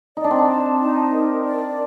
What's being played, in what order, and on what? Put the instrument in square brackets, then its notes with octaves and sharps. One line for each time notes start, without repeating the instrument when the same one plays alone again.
[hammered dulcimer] D#4 [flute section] D5
[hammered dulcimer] D4
C4
D4
[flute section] A5
D#4
A#4
D5